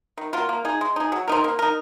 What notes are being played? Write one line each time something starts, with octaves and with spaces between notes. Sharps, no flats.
D#3
F#3 A#3 F4
A#3
D#4 G#4
G#3
D#4 G#4
F#3
C4 D#4 A#4
A#3
D#4 A#4